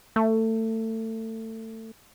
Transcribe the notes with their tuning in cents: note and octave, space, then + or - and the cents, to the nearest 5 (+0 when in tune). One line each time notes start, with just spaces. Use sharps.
A3 +25